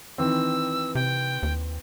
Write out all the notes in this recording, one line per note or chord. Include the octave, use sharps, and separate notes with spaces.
D#3 E3 C4 E6
C3 G5
D#2